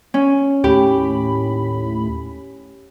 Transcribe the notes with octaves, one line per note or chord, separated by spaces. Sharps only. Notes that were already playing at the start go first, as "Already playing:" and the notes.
C#4
D#2 A2 G4 B5